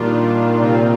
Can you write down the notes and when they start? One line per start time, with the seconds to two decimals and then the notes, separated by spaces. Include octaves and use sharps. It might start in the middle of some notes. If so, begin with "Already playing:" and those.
Already playing: A#2 D#3 G3 D4 F4
0.60 C3 D#3 G3 C4 F4